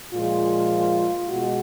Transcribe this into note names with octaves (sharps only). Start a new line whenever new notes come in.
A#2 F3 G#3 F4
B2 G#3 F#4